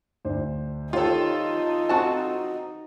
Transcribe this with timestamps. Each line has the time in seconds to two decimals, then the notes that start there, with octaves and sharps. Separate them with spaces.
0.25 D2 D4 C5
0.93 D#3 D#4 F4 G4 A4 C5 C#5
1.89 C4 F#4 A5 A6